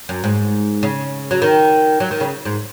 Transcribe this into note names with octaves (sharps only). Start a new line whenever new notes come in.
F#2
G#2
C#3
F#3
D#3
F#3
D#3
C#3
G#2